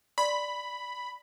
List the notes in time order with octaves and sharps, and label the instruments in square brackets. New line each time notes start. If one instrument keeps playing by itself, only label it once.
[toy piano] D5 C6 [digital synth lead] B5